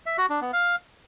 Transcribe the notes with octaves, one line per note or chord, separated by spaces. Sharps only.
E5
F#4
D4
B3
F5